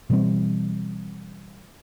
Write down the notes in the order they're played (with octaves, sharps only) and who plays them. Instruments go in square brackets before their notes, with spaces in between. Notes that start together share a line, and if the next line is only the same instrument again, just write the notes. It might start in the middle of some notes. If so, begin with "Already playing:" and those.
[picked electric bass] B2 E3 G3 C4